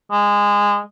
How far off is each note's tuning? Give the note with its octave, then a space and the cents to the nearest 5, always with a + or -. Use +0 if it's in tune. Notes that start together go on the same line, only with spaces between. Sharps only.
G#3 -20